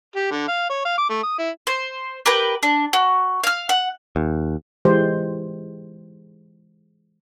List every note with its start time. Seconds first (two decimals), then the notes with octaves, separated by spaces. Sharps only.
0.16 G4
0.31 D3
0.48 F5
0.70 C#5
0.85 F5
0.98 D6
1.09 A3
1.23 D#6
1.39 E4
1.67 C5
2.26 G4 A#4 B4 G5
2.63 D4
2.93 F#4
3.44 F5 F6
3.69 F#5
4.16 D#2
4.85 E3 G#3 G4 C5